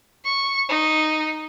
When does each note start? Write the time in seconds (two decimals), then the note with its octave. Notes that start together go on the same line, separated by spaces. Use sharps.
0.25 C#6
0.69 D#4